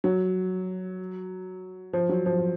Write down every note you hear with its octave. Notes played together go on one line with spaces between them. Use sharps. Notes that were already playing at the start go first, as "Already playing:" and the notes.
F#3
F3
F#3
F3